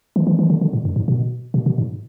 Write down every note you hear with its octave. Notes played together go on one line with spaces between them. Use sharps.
E3
E3
E3
D3
D3
A2
F#2
G#2
B2
B2
B2
G#2